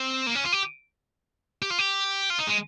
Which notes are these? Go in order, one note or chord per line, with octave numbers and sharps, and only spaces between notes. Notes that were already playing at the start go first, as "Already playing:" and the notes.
Already playing: C4
A#3
C#4
F4
G4
G4
F4
G4
F4
D#4
G#3